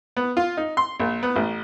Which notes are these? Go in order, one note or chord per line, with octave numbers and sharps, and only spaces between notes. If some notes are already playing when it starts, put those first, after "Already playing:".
B3
F4
D#4
C6
A#1
B3
A1